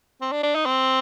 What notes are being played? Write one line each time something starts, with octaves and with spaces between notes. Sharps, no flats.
C4
D4
D4
D#4
C4